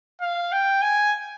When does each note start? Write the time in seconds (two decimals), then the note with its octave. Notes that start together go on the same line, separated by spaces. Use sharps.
0.21 F5
0.52 G5
0.82 G#5